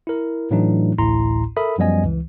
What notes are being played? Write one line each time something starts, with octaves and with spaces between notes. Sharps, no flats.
E4 A#4
A2 E3 F#3 A3 D4 D#4
A1 D2 A2 E4 A#5 C6
A4 A#4 E5 B5 D#6
F#2 F3 G3 B3 D#5 G#5
C#2 E3